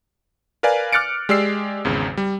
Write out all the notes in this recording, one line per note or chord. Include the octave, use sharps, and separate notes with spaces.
A#4 B4 D5 F5 G#5
D6 F6 F#6 A6 C#7 D7
G#3 G4 D5 E6 C7
G#1 E2 C#3
G3